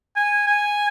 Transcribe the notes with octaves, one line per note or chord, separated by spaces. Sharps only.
G#5
G#5